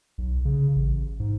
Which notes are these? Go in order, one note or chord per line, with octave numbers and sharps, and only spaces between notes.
B1
C#3
A1
G#2